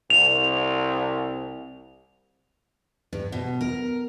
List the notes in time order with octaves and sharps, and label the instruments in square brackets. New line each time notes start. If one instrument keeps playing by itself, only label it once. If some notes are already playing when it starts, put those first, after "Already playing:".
[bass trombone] C2 [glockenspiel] F7
[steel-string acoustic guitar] G2
B2
A#4